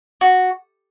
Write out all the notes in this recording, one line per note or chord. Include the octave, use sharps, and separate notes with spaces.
F#4